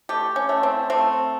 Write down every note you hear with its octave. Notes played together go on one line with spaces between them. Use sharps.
A3 G4
C#4
A3
C4
A3 C4